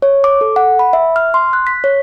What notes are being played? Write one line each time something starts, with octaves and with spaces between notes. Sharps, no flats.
C#5
D6
A4
F#5
B5
E5
F6
C6
F#6
B6
C#5